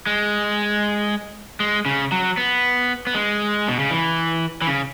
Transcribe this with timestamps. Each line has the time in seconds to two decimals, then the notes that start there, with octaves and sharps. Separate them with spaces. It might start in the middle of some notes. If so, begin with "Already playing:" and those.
0.07 G#3
1.60 G#3
1.86 C#3
2.12 F#3
2.37 B3
3.07 B3
3.14 G#3
3.68 B2
3.80 C#3
3.91 E3
4.62 E3
4.67 C#3